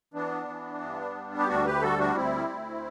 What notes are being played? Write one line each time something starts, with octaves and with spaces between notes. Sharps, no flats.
E3 B3 D4
E3
G2
G3
G4
D2 D4 F#4
G4 B4
G3 F#4 A4
D4 F#4
D2 C4 E4
D2